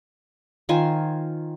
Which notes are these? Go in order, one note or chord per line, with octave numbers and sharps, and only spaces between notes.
D#3 F4 C5 G#5